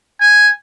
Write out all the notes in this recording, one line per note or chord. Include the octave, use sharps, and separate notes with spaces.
G#5